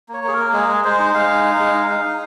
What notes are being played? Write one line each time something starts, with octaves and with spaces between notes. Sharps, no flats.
A#3 C#5
A#3 G#4
A#4
A#3
G#3 G#4
G#3
G#3 C5
D#4
G#3 F5
D#4
D#4
G#3
D#4
D#4
D#4